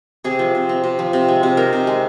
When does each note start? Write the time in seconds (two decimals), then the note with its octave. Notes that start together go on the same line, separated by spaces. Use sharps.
0.24 C3 G#4
0.39 F3
0.55 C3
0.69 C4
0.84 C3
0.99 F3
1.13 C3
1.28 G#3
1.43 C3
1.57 D#4 A#4
1.73 C3
1.87 G#3